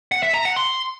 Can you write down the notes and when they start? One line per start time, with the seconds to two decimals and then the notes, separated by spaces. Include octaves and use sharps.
0.12 F#5
0.23 E5
0.34 A#5
0.45 F#5
0.56 C6